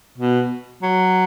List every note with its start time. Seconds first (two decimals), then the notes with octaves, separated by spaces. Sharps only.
0.18 B2
0.83 F#3